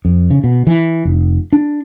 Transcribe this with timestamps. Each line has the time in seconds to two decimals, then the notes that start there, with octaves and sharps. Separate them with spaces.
0.05 F2
0.31 C#3
0.44 B2
0.67 E3
1.05 F1
1.53 D4